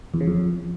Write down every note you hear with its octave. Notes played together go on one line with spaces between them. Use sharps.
E2
C#3
F2